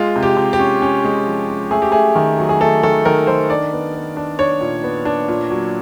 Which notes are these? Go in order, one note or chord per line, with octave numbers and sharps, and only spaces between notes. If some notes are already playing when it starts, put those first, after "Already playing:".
Already playing: G#3 F4
C3
G4
C3
G4
C#4
C#4
G#3
F3
C#4
A3 G#4
G4
A3 G#4
D#3
F#3
G#4
A3 A4
D#3 A4
D#3 A#4
D#3 C5
D4 D5
B3
B3
D4
D4 C#5
A#2
B3
D4
A#2
F#3